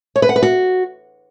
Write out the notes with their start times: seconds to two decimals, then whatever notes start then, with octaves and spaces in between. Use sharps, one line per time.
0.16 C#5
0.22 B4
0.29 F#5
0.36 B4
0.42 F#4